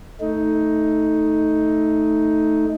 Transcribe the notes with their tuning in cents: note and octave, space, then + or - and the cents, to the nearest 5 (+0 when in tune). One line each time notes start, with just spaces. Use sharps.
A3 +0 D#4 +10